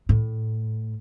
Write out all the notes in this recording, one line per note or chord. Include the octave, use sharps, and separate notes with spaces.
A2